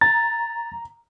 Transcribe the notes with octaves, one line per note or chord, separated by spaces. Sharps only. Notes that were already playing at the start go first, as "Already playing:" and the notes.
A#5 A6